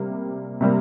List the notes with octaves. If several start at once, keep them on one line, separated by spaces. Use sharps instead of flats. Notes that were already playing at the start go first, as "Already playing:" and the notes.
Already playing: C3 G3 A#3
C3 G3 A#3